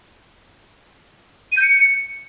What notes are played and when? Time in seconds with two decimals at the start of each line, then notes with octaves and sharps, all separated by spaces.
1.52 D#7
1.57 G6
1.62 C#7